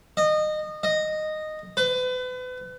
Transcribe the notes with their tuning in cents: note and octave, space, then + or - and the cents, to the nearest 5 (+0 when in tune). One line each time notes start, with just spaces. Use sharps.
D#5 -25
D#5 -10
B4 +35